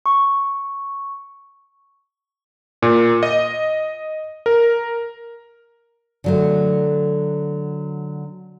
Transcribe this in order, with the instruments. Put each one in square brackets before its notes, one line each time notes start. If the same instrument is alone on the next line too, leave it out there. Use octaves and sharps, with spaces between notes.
[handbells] C#6
[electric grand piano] A#2
D#5
A#4
[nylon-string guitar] D3 F#3 A3